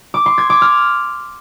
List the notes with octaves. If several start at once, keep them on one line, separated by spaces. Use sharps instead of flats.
D6
C6
G#6
D6
F6